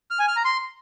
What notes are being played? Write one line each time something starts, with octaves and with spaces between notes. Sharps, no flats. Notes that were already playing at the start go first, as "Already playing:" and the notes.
F6
G#5
F6
A#5
C6